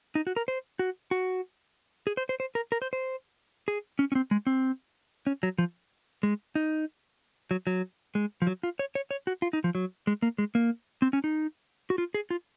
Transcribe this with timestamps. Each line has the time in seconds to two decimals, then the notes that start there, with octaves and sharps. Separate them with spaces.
0.15 D#4
0.27 F#4
0.36 A#4
0.48 C5
0.79 F#4
1.11 F#4
2.07 G#4
2.17 C5
2.29 C5
2.40 C5
2.55 A#4
2.72 A#4
2.82 C5
2.93 C5
3.68 G#4
3.99 C#4
4.12 C#4
4.15 C4
4.31 G#3
4.47 C4
5.27 C#4
5.43 F#3
5.58 F3
6.23 G#3
6.55 D#4
7.51 F#3
7.67 F#3
8.15 G#3
8.42 F3
8.47 F#3
8.63 F4
8.79 C#5
8.95 C#5
9.11 C#5
9.27 F#4
9.42 F4
9.53 D#4
9.64 F3
9.75 F#3
10.07 G#3
10.22 A#3
10.38 G#3
10.55 A#3
11.02 C4
11.13 C#4
11.24 D#4
11.90 F#4
11.98 F4
12.14 G#4
12.30 F4